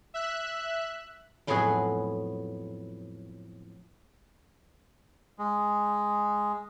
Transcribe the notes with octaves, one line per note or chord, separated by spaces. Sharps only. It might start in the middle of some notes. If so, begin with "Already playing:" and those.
E5 F#6
F2 A2 F#3 B3 G#4 F#5
G#3